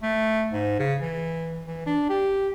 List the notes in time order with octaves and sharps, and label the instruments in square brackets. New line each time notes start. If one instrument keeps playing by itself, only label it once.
[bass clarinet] A3
G#2
C#3
E3
E3
D4
G4